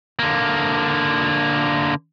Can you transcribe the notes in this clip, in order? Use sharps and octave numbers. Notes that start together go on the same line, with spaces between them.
D3 A#3